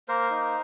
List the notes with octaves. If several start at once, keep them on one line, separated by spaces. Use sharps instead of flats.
A#3 A#4 C5
D#4